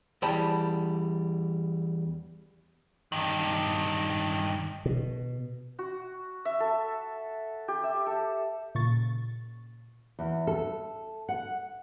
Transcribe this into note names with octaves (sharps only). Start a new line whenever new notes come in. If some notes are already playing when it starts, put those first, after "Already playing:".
E2 G3 D5 G5 A5 B5
G2 D#3
B2
F#4
E5
A4
G4
E5
A4
A#2 C#3 C#6 A6
E2
A4
F#5